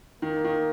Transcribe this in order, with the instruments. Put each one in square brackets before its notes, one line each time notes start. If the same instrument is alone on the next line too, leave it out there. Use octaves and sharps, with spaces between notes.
[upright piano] D#3 [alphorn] A#3
[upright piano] D#3